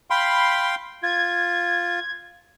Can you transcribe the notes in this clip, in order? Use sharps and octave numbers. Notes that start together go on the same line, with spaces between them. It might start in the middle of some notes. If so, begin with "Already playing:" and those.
F5 G5 B5 C6
F4 G#6